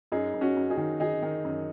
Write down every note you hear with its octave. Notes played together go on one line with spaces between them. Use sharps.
F#2 D#4 G#4
F#2
C#4 F#4
F#2
D#4 G#4
D#3
D#3 D#4 G#4
D#3
F#2